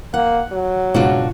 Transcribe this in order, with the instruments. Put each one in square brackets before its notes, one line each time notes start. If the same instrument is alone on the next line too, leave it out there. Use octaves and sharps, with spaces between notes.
[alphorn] A#3 [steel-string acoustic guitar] F#5
[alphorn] F#3
[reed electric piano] C#2 G#2 B2 [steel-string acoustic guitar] D4 F4 F#4